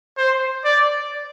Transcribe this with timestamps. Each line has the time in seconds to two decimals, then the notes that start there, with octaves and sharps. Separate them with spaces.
0.18 C5
0.65 D5